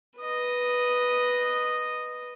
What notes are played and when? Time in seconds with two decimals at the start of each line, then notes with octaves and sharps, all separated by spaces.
0.19 B4 D#5